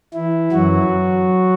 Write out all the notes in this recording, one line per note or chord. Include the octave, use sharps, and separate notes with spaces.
E3 E4
F#2 E3 F#3 F#4